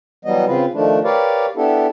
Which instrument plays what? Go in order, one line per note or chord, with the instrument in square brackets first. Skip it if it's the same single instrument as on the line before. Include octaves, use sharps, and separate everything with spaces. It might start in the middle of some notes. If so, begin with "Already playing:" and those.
[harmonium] E3 F#3 G3 B3 D#5
C#3 C4 F4 B4
D#3 F3 A3 D4
G4 A#4 B4 C#5 D5 F5
B3 D4 E4 G4 A4